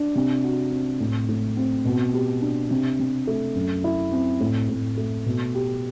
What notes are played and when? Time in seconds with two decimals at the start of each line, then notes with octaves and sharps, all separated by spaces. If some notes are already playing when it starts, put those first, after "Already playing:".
Already playing: D4
0.15 C3
0.44 F#4
0.72 C4
1.00 A2
1.29 A2
1.57 C4
1.85 B2
2.14 G4
2.42 D4
2.71 C3
2.99 C3
3.27 A3
3.55 F#2
3.84 E4
4.12 C4
4.40 A2
4.69 A2
4.97 A3
5.26 B2
5.55 G4